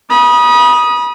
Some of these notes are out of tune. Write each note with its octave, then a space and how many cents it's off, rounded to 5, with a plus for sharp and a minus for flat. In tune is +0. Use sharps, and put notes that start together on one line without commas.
B5 -35 D#6 +0